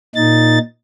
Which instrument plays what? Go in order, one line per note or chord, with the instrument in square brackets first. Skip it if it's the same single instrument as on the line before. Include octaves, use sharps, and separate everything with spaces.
[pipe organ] A#2 D#4 A6